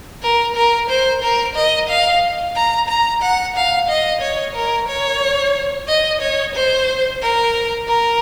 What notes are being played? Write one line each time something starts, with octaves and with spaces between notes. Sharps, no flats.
A#4
A#4
C5
A#4
D#5
F5
A#5
A#5
F#5
F5
D#5
C#5
A#4
C#5
D#5
C#5
C5
A#4
A#4